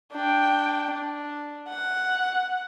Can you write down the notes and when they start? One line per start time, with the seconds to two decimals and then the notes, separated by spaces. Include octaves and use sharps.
0.13 D4 G5
0.91 D4
1.69 F#5